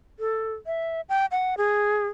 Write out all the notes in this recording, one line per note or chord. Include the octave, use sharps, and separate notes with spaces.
A4
E5
G5
F#5
G#4